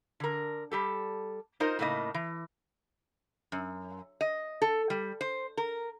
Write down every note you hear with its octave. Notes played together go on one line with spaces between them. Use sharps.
D3 A#4
G3 G4 A4
D#4 F4 A#4 C5 D#5
A2 C#3 A3 A#3 D#4 D#5
E3
F#2
D#5
A4
G3
C5
A#4